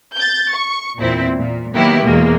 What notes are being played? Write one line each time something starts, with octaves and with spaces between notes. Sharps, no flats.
G6 A6
C#6
E2 A#2 C4 E4
A#2
D#3 F#3 A#3 B3 E4 G4
E2 B2 G#3 A#3